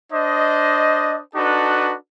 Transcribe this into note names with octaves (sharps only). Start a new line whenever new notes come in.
D4 C5 D#5
D4 D#4 F#4 A4 B4